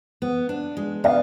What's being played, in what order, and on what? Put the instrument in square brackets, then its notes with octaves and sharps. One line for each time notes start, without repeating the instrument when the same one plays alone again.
[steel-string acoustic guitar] B3
D4
G#3
[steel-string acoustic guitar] B3 [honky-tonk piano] D5 F5